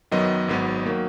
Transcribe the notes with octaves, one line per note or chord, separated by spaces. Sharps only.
F#2 D#3 F#3 B3 D#5
G#1 G#2 F#3 B3
D#3 F#3 A#3